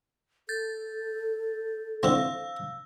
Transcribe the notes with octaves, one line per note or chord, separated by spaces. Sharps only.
A4 G6 A6
D3 E3 C4 F5 E6